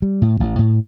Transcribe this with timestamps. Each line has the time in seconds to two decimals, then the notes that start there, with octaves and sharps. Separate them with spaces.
0.02 G3
0.22 A2
0.40 A1
0.59 A2